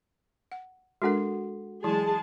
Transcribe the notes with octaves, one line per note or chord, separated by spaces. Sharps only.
F#5
G#3 D4 F#4 A4 A#4 F#5
E3 F#3 G#3 E4 G#4 A5